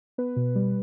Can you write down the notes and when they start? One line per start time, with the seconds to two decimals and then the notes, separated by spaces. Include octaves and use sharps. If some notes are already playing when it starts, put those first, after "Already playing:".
0.18 B3 B4
0.36 B2
0.56 G3